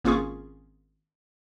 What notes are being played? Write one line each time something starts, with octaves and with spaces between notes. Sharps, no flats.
G#1 A#3 C#4 F4 G#4 C#6